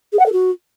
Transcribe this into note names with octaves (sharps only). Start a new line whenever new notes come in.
G#4
F#5
A4
F#4